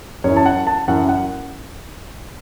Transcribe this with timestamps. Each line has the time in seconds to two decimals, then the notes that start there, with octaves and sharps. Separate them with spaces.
0.24 F#2 E3 C#5
0.36 A5
0.46 F#5
0.67 A5
0.88 F#2 E3 F#5
1.09 F#5